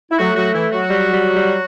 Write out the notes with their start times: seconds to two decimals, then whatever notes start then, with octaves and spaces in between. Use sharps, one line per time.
0.11 E4
0.19 F#3 A3 F#4
0.36 F#3 F#4
0.54 E3 E4
0.72 F#3 F#4
0.90 G3
1.13 G3
1.36 G3